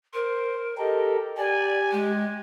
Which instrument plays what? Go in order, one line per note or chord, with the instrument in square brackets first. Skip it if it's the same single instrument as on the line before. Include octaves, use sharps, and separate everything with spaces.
[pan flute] A#4 [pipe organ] C5
[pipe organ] G4 A4 A#4 [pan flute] D#5
[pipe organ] G4 [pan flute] D5 [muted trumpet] G#5
[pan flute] G#3